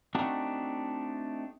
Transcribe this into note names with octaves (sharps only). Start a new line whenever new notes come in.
A3 C4 D4 D#4 F#4